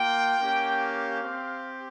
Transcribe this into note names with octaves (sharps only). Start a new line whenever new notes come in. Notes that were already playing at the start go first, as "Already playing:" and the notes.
Already playing: A#3 F4 G5
A#3 C#4 G4
F5
C4 G4